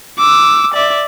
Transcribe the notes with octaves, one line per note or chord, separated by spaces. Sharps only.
D6 E6
D5 E5